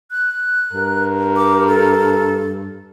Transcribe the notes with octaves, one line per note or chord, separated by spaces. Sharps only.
F#6
G2 A#4
D6
A4